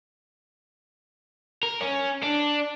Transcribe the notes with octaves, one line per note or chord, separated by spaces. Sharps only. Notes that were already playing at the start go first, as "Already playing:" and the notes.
A#4
C#4
D4